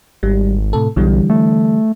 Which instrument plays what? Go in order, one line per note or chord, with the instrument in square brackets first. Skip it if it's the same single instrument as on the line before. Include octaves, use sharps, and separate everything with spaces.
[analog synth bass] G#1 [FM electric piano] G3
[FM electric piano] A2 C3 A4
[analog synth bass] B1 [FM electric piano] D3 E3 G3
[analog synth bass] A3